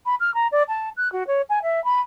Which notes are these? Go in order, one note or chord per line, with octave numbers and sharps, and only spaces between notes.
B5
F6
A#5
D5
A5
F#6
F#4
C#5
G#5
E5
B5